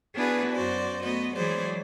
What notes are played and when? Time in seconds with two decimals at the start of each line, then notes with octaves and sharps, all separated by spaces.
0.14 B3 D4 E4 F#4 G#4 B4
0.53 F#2 F#4 C5 D5
1.03 A3 B3 F#4 D#5
1.35 E3 F#3 G#3 G#4 C5 D5